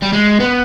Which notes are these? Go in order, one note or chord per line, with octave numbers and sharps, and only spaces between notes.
G3
G#3
B3